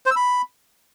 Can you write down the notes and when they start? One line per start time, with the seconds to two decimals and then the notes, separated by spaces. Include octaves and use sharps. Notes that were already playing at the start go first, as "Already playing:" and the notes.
0.06 C5
0.11 E6
0.16 B5